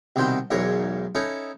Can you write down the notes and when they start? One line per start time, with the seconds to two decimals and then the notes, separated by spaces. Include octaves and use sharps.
0.16 C2 B2 D#3 C5 G5
0.51 B1 E2 G#2 A#4 C#5
1.15 C#4 D#4 E4 A4